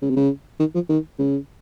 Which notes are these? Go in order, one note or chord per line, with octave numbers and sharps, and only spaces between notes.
C#3
C3
C#3
D#3
F3
D#3
C#3